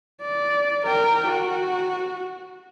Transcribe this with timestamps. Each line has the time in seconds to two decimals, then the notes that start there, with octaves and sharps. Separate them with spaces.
0.22 D5
0.86 A#4 G5
1.28 F#4